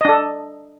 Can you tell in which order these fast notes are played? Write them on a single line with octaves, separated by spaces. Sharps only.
D#5 D4 A4